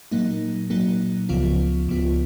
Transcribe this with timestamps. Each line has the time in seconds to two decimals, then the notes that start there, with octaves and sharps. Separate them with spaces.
0.12 A#2 F#3 A#3 D#4
0.70 A#2 F#3 A#3 D#4
1.29 C#2 C#3 F3 B3 F4
1.88 C#2 C#3 F3 B3 F4